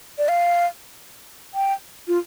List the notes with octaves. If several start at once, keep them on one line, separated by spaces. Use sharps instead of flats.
D5
F5
G5
F4